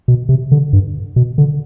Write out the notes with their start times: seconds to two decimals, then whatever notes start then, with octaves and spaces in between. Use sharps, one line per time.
0.08 B2
0.29 C3
0.52 D3
0.73 G2
1.16 B2
1.38 D3